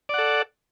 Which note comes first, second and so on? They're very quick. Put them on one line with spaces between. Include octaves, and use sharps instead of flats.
D5 F#5 A4